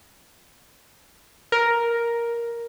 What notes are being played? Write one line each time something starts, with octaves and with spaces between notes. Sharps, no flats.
A#4